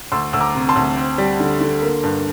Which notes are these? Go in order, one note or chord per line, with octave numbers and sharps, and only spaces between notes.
D2 C6 E6
D2 E6
A#5 D6
C3
A5 C6
D2
C4
G3
D3
D3
A#3
G2